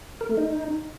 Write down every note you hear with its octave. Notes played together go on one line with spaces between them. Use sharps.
A#4
A3
D#4